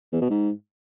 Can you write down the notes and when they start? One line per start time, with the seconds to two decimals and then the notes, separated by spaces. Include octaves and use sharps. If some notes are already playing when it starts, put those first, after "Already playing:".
0.13 E2
0.21 B2
0.30 G#2